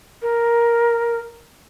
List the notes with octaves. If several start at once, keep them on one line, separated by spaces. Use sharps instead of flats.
A#4